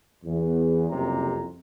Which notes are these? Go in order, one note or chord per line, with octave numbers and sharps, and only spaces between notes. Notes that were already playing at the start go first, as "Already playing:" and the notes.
E2
F#1 C2 F2 C3 G4 A#5